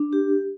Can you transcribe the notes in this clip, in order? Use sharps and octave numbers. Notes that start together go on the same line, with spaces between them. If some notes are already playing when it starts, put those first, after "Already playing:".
Already playing: D4
G4